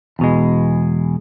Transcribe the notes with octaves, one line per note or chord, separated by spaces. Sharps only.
E2 B2 G#3